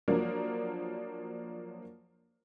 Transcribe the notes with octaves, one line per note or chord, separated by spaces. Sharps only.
F3 F#3 A#3 D4 A#4